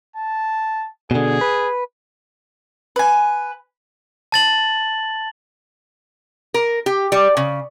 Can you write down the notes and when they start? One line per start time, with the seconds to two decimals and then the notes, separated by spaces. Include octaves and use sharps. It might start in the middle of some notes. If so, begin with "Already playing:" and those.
0.16 A5
1.11 B2 D3 G#4
1.41 B4
2.96 B4 G#5
4.32 A5 A6 F#7
6.54 A#4
6.86 G4
7.12 G3
7.37 C#3